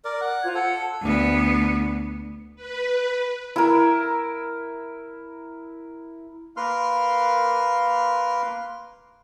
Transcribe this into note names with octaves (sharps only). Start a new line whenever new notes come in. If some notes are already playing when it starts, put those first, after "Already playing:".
A#4 D5
F#5
F4 C5 G#6
A4 F#5
D2 B3
B4
E4 A#4
A#3 A#4 B4 C6 F6